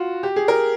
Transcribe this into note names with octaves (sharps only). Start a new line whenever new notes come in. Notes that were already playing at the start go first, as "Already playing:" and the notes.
Already playing: F4 F#4
G4
G#4
A#4